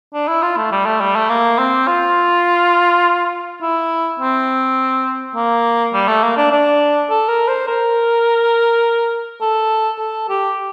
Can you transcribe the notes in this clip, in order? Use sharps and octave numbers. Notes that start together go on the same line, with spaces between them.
D4
E4
F4
A3
G3
A3
G3
A3
A#3
C4
F4
E4
C4
A#3
G3
A3
A#3
D4
D4
A4
A#4
C5
A#4
A4
A4
G4